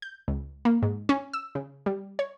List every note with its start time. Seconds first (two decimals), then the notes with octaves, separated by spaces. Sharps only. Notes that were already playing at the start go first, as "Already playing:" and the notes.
0.02 G6
0.28 C#2
0.65 A#3
0.83 G#2
1.09 C#4
1.33 E6
1.55 C#3
1.86 G3
2.19 C#5